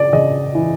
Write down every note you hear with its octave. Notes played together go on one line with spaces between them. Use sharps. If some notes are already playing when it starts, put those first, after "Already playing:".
Already playing: C#3 D5
C#3 D#5
E3